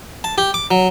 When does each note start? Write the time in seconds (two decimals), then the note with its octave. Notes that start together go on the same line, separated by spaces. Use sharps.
0.24 A5
0.38 G4
0.54 D6
0.71 F#3